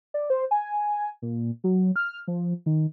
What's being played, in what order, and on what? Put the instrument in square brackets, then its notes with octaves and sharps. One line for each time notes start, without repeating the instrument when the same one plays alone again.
[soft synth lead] D5
C5
G#5
A#2
F#3
F6
F3
D#3